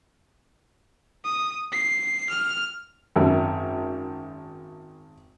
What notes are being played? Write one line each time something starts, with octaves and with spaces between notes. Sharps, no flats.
D#6
C7
F6
G#1 F#2